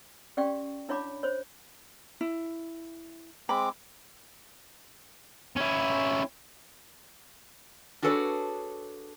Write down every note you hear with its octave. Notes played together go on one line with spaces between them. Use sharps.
C#4 G4 D5 F5 G5 C#6
D4 E4 C#5 F5 B5 D6
C5 C#5
E4
G#3 C4 B5 D6
C#4 E4
D4 F#4 G#4 A4 B4 C#5